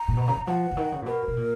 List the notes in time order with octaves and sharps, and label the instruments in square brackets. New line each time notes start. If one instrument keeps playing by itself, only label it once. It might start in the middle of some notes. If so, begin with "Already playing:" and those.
Already playing: [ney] A#5
[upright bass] A#2
B2
C#3
D#3
[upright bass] F3 [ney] F#5
[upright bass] C#3
D#3
C#3
A#2
[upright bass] B2 [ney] A#4
[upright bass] B2
A#2